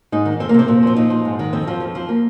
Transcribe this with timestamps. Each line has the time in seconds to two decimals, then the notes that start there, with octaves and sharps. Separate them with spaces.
0.12 G#2 D#4
0.25 D#3
0.40 F2 C4
0.49 A#3
0.54 C3 C4
0.68 A#2
0.83 F3 C4
0.96 A#2 D#4
1.10 F3
1.25 G#2
1.39 D#3
1.53 F2 C4
1.67 F3
1.80 F2
1.95 F3
2.09 A#3